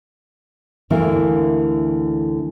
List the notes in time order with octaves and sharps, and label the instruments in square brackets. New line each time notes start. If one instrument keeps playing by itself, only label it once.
[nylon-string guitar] D2 D3 E3 A#3 A#4